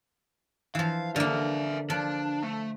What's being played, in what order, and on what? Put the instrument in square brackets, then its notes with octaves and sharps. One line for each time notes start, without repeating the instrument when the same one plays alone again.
[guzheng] E3 F3 [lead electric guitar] F5
[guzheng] D3 A#3 [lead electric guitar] A#4 E5
[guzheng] F3 [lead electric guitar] D4
[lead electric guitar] A3